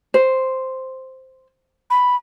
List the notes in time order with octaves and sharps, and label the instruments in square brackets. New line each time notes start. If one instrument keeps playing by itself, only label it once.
[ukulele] C5
[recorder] B5